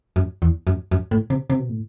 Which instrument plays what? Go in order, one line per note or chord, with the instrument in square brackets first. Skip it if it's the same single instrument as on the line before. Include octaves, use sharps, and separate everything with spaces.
[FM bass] F#2
E2
F#2
F#2
A2
C3
C3
B2
A2